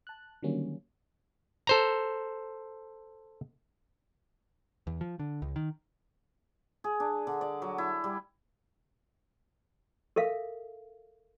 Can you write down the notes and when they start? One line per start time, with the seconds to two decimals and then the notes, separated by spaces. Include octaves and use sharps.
0.07 A5 F#6
0.43 D3 D#3 F#3 G3 A#3 C#4
1.67 A4 C5 A#5
4.87 E2
5.01 F3
5.20 D3
5.42 C#2
5.56 D#3
6.84 G#4
7.00 D4
7.27 D3
7.41 D5
7.62 F#3
7.78 E4
8.04 G3
10.16 A4 A#4 E5 F5